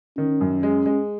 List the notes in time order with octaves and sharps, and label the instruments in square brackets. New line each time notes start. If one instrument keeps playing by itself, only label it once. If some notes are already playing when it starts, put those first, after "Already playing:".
[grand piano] D#3 [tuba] C#4
[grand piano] F#2
G#3
G#3